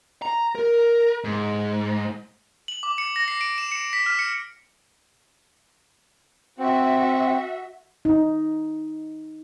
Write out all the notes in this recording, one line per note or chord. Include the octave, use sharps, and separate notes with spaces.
A#5
A#4
G#2
F#7
D6
C#7
A#6
C7
D7
E7
C#7
B6
F6
C#7
C4 F#4 E5
D#4